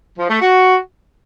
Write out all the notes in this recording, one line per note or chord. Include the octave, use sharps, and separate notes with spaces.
F3
A3
F#4